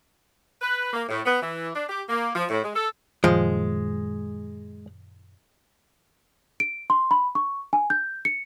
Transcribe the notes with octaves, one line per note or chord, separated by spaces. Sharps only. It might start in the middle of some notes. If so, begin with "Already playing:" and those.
B4
A#3
A2
B3
E3
D4
G4
A#3
F3
A2
G#3
A4
F#2 A#2 D#3 F3 G#3
D7
C6
B5
C#6
G#5
G6
C#7